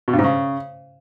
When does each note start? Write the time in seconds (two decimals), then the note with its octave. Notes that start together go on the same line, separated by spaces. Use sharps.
0.08 B2
0.13 G2
0.19 G#2
0.24 C#3